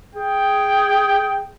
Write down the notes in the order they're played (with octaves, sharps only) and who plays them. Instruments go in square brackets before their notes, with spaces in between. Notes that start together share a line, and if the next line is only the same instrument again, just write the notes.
[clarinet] G#4 [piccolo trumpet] G5